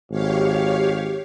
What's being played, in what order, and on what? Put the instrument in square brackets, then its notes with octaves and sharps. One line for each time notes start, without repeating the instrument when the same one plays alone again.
[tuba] G#1 [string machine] G4 C#5 F5